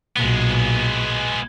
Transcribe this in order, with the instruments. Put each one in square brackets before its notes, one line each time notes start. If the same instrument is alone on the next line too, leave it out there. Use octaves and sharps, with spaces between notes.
[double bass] B1 A#2 [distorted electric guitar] G#3 B3